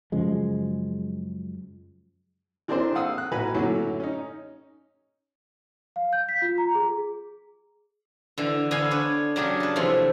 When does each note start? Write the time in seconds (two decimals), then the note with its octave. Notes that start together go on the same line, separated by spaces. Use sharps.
0.12 F#2 C#3 F3 G#3
2.68 E3 C4 D4 G#4 A#4 C5
2.95 F5 F#5 D#6 E6
3.18 F#6
3.31 A1 F#4 B4 G#5 A#5 B5
3.55 F#2 A2 D3 F#3
4.00 C#4 D#4
5.96 F5
6.13 G6
6.29 B6
6.42 F4
6.58 A#5
6.75 G#4
8.38 D3 E3
8.71 D3 B3 F5 G#5 B5
8.91 D4 B4 C#5
9.36 C#3 F#3 D4 G4 G#4
9.60 B4 A5
9.76 C3 E3 F3 A3